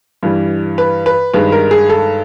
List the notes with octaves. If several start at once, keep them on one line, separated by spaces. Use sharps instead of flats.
G2 E3 G3
B4
B4
G2 D#3 G#3 B4
A#4
G#4
A4